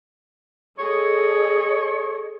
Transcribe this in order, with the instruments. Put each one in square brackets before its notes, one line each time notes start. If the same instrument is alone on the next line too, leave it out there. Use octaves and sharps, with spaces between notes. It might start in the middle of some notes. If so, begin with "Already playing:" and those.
[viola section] G#4 A4 D#5 [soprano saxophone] C#5